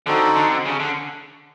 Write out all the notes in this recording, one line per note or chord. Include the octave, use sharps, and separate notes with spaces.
D3 C4 D#4 F#4 A4
D3
C#3
D3